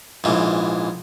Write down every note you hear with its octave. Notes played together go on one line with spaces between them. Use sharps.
A#1 G#2 E3